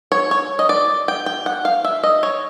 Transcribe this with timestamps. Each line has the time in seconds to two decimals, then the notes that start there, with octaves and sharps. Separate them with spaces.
0.12 C#5
0.31 C#5
0.59 D#5
0.69 D5
1.08 G5
1.26 G5
1.46 F#5
1.65 F5
1.84 E5
2.03 D#5
2.23 C#5